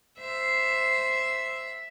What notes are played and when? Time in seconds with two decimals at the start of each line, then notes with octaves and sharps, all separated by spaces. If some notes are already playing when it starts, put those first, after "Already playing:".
0.20 C5 E5